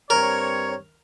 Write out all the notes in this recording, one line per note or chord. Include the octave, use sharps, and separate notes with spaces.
G2 C4 A#4 C#5